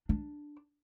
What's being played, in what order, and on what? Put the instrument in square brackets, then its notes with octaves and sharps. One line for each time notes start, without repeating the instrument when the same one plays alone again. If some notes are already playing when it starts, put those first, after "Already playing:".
[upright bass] D4